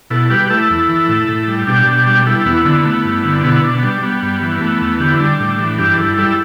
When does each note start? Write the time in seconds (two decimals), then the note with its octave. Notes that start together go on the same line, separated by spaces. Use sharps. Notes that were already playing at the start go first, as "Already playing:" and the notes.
0.10 B2 E4 A4
0.30 G3 G4 B4
0.45 G4
0.50 A3 E4 A4
0.70 E2
0.89 E3
1.09 A2
1.28 A2
1.48 G3
1.67 B2 D4 G4
1.87 B2
2.07 G3
2.26 G3 E4 A4
2.45 E2 B3 E4
2.65 D3 B3 E4
2.84 A3 B3 E4
3.05 G2
3.24 D3
3.43 B2 B3 E4
3.63 B2 D4
3.79 B3
3.83 G3 D4
4.02 G3 B3
4.22 G2
4.41 E3
4.61 A3 B3
4.81 E2
5.00 D3 G4
5.10 E4
5.20 G3 D4
5.40 A2
5.58 E3
5.78 G2 D4 G4
5.98 G2 E4 A4
6.17 G3 E4 A4